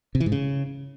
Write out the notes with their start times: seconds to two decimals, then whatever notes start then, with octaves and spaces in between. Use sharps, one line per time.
0.15 C3
0.20 E3
0.26 G#2
0.32 C#3